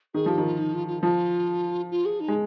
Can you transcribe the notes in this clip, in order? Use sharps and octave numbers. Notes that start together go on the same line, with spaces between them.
D#3 G#4
F3 G4
D#3
F4
D#4
F4
F4
F3 F4
F4
G#4
D#4
G#3